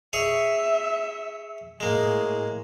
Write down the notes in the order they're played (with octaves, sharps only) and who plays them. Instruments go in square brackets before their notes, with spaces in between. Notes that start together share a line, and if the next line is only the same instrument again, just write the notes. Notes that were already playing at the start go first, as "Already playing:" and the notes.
[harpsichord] G#4 C#5 C#6 [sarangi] E5
[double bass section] A2 [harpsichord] G#3 A#3 [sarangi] G#4